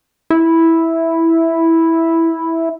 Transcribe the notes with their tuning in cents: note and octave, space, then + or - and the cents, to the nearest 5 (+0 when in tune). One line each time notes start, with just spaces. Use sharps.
E4 -5